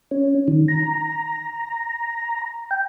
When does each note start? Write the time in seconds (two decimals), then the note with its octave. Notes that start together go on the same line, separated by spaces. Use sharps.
0.11 C#4
0.48 D#3
0.68 A#5
2.71 G5